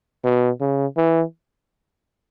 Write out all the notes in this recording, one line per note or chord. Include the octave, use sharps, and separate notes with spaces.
B2
C#3
E3